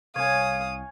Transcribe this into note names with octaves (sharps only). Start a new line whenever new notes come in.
C2 C#5 F5 G#5 D#6